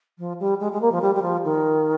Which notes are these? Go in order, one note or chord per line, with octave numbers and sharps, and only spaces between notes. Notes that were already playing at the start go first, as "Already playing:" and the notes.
F3
G3
G#3
G#3
A#3
F3
G3
G3
F3
D#3